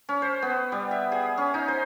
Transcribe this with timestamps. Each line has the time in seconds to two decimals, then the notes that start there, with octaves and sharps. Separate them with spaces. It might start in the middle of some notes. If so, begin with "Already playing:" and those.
0.09 C#4
0.22 C5
0.42 B3
0.72 G3
0.91 E5
1.12 G#4
1.38 C#4
1.54 D#4
1.68 C5